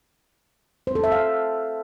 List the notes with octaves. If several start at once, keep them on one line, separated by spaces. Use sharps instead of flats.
C5
A4
E5
F5